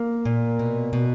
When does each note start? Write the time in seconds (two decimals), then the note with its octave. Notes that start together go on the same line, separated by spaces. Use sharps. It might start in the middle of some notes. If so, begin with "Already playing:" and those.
Already playing: A#3
0.25 A#2
0.59 B2
0.93 B2